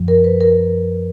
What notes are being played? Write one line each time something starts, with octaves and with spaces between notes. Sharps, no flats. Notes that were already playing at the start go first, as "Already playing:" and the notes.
Already playing: F#2 F3
A#4
B4
A#4